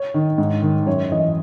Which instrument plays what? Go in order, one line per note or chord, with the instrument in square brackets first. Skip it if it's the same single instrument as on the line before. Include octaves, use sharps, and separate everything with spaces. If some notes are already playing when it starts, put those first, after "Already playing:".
Already playing: [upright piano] C#5
D#3
G#2
D#3
F#2 C#5
E3 D#5